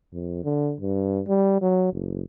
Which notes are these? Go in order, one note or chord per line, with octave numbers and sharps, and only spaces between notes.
F2
D3
G2
G3
F#3
F#1